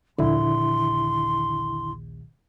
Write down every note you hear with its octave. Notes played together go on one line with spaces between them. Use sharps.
A#1 D#2 D3 E4 C6